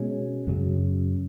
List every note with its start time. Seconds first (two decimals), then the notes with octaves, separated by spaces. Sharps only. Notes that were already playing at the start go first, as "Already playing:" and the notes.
Already playing: B2 G#3 C#4
0.47 F#2 C#3 F#3